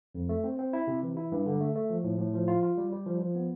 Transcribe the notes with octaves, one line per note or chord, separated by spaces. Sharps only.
F2
A3
C4
C4
E4
C3
E3
E4
G2
D3
A3
A3
F3
A2
A2
F3
F4
F4
G3
G3
F3
F3
B3